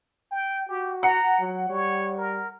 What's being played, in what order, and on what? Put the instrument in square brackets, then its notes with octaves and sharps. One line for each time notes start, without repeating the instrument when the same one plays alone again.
[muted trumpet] G5
[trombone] F#4 [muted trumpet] G4
[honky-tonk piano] F#5 C#7 [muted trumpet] A#5
[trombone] F#3
[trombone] G3 [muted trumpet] C#5
[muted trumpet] A#4